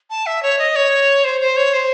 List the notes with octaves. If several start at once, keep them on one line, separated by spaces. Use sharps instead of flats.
A5
E5
C#5
D#5
C#5
C5
C5
C#5
C5